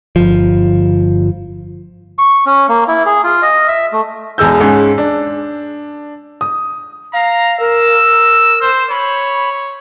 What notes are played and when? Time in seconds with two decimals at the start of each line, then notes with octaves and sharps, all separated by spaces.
0.16 G1 F3
2.19 C#6
2.46 C#4
2.69 A#3
2.88 E4
3.06 G#4
3.24 F4
3.42 D#5
3.68 E5
3.92 A3
4.38 B1 E2 G#3 E6 G6
4.60 G#2 C#4
4.98 D4
6.41 D#6
7.14 F5 A#5
7.60 A#4 E6
8.61 C5
8.90 C#5 B5